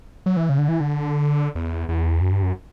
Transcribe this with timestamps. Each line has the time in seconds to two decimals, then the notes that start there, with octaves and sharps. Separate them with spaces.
0.26 F#3
0.37 E3
0.49 C#3
0.58 D3
0.68 E3
0.80 D3
1.55 E2
1.89 E2
2.21 F#2
2.32 G2
2.42 F#2